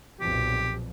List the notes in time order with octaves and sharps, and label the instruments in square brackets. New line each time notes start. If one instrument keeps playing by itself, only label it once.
[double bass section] B1 F2 A#2 [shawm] G4